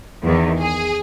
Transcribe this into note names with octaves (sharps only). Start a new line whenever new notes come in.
E2 D#3
G#4